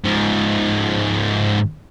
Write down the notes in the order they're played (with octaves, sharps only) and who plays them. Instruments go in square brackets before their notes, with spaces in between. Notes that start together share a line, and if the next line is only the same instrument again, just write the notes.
[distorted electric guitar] G#2 F3